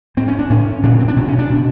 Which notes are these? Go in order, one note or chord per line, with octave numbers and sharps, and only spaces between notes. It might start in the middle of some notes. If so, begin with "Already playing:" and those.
A2 C4
C#4
D4
A2 C#4
A#2 D4
C#4
C4
D4
B2 C#4
C#4
D4
B2